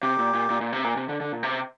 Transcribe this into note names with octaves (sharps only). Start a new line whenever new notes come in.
C3 G4
A#2
A#2
A#2
A#2
C3
A#2
C3
D3
D3
A#2
C3